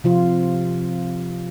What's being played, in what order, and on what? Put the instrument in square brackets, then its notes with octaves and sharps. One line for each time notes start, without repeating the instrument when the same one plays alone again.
[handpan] C3 F3 F4